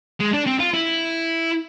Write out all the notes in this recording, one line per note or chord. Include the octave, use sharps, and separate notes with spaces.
G#3
D4
C4
F4
E4